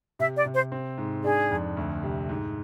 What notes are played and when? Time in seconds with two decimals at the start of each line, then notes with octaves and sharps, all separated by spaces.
0.19 C3 E5
0.37 D5
0.45 C3
0.54 C5
0.72 C4
0.98 G#2
1.24 D4 G#4
1.51 F2
1.77 D2
2.03 C3
2.29 G#2